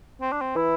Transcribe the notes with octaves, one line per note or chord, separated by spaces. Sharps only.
C4
D4
C4
E3 E4